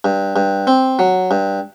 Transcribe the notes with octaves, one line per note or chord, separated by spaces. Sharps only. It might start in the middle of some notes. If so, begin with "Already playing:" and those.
G2
G2
C4
F#3
G2